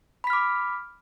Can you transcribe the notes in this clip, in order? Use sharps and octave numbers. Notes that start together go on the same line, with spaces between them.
B5 D6 F6 B6